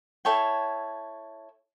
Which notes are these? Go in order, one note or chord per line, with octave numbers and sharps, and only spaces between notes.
E4 A4 C#5 G5